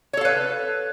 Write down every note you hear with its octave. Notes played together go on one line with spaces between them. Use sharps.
A4 B4 C#5 F5